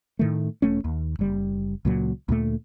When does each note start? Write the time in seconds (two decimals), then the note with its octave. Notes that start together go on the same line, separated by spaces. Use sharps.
0.19 A2 D#3 A3
0.62 E1 A3 C#4
0.84 D#2
1.19 F#1 G3
1.85 C#2 A#2 F#3
2.28 D2 A#2 A3